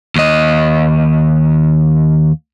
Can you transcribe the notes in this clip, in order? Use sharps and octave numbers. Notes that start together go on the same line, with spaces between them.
D#2 D#5